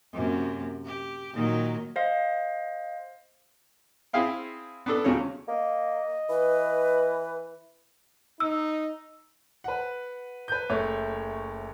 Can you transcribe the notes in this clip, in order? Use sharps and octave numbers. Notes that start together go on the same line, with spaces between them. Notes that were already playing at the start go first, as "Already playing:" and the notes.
F#2 C3 A#3
G4
A#2 D#3 F#3
C5 D#5 F5
C4 E4 G#4 E5 F5 G5
B3 D4 A4
E2 C#3 F3 F#4 C#5
A#3 D#5
E3 B4
D#4 E6
B4 F#5
B4 G6
F#1 A3 C#5